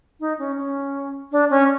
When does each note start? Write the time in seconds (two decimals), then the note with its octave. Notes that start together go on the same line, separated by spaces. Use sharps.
0.20 D#4
0.39 C#4
0.57 C#4
1.32 D4
1.50 C#4